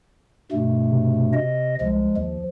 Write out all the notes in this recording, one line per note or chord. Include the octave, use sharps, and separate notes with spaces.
G2 B2 A3
C3
D#5
C2 F3 G#3
D#2 F3